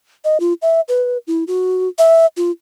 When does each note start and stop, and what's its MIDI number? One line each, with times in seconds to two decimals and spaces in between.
0.24 0.38 75
0.40 0.53 65
0.62 0.81 76
0.88 1.17 71
1.27 1.44 64
1.47 1.88 66
1.98 2.26 76
2.37 2.51 65